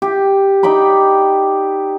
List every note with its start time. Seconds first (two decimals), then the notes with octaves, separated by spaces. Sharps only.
0.02 G4
0.63 D#4 D5 G5 B5